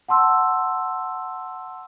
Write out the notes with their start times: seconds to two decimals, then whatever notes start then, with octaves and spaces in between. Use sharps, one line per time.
0.08 F#5 A5 C6 E6